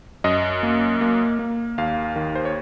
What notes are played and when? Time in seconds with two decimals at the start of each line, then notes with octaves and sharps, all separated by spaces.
0.24 F#2 D#5
0.63 A#3
1.01 A#3
1.39 A#3
1.78 D#2 F5
2.16 D#3
2.35 C5
2.45 C#5